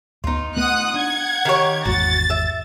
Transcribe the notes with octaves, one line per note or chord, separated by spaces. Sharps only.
D2 B3 D#4 F4
A3 B3 F#5 D#6 F#6
D4 F#5 G#6
D#3 G4 C#5
G#1 E2 F#4 A6
E5